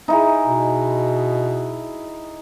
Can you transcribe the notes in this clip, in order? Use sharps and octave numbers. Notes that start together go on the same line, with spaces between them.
D#4 E4 G#4
B2